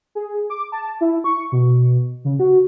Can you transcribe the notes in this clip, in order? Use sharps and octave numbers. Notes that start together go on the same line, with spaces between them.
G#4
D6
A5
E4
C#6
B2
C#3
F#4